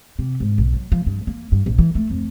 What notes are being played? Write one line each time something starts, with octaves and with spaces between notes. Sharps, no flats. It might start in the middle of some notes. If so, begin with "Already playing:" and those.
C3
G#2
B1
F#3
F3
G2
A#3
G2
A#1
E3
A3
F2